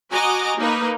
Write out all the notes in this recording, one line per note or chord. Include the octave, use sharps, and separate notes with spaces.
F#4 D#5 G#5 A#5 D6
A#3 D#4 B4